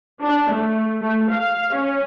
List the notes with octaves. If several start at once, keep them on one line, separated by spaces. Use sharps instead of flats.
D4
A3
A3
F5
C#4